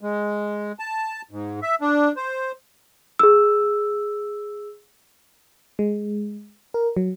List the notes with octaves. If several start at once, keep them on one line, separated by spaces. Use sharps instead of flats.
G#3
A5
G#2
E5
D4
C5
G#4 E6
G#3
A#4
F#3